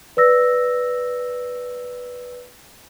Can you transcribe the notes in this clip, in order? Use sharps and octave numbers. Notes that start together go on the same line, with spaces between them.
B4 D5 E6 A#6